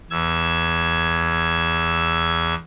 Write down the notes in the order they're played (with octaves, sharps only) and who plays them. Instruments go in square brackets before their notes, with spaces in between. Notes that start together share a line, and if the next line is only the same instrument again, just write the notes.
[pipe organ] E2 E6 G#6